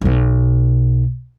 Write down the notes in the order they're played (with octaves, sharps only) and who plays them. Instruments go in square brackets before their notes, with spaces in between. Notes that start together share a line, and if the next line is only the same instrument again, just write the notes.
[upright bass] B1 B2